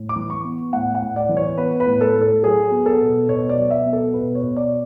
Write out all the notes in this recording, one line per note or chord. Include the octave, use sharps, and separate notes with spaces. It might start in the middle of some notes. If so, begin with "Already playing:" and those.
Already playing: A2
D6
E3
C#6
B3
A2 F#5
F#5
A2
D5
E3
C#5
B3 B4
B4
A2
A4
A2
A4
F#3 G#4
B3
A4
B2
B2 C#5
D5
F#3
E5
B3
A4
B2 B4
C#5
B2
D5